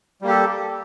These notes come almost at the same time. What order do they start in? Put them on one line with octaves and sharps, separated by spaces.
G3 A#3 G4 A4